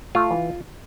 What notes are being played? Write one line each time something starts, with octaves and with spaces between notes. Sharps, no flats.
A3 F4
E3